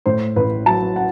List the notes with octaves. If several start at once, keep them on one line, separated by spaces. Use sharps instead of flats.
A2 C5
A1 B4
F#3 A5
F#5